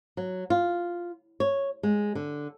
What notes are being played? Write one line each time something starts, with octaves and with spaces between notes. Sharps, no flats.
F#3
F4
C#5
G#3
D3